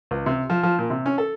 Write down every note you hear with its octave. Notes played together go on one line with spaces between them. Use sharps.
C#2
C3
F3
F3
A#2
C3
C#4
A4